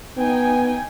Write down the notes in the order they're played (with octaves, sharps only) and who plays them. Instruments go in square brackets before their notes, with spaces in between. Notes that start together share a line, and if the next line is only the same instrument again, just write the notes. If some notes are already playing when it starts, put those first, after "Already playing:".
[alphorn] B3 [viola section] D#4 G5 G#5